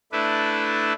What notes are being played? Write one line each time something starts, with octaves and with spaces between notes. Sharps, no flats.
A3 D4 E4 B4